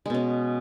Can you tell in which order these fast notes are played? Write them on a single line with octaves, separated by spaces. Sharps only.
G#3 B2 C#4